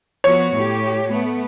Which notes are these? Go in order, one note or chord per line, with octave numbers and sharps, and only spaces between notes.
F3 B3 F#4 C#5
A2 G4
A3 B3